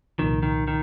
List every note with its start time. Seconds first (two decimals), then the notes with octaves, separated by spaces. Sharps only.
0.19 C2 A#2 D#3 F3
0.43 D#3
0.68 D#3